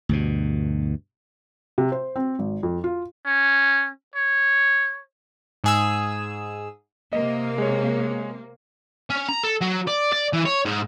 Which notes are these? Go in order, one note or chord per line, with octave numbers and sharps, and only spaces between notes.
D2 G2 B2
C3
C5
C4
G#1
F2
F4
C#4
C#5
G#2 G#4 E6
C3 A#3 D#5
G#3 C#5
C#4
A#5
A4
F#3
D5
D5
E3
C#5
G#2